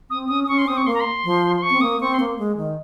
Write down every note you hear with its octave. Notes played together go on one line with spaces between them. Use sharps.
C4 D#6
C#4 D#6
D#6
C#4 C#6
C6
C4 D#6
C#6
A#3 C6
A#5
C6
F3
C6
C#6
C4
A#3 D#6
C4 C#6
C6
A#3
G#3
D#3